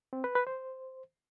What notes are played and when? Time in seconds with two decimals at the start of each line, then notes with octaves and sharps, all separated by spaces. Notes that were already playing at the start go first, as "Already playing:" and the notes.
0.13 C4
0.24 B4
0.35 B4
0.47 C5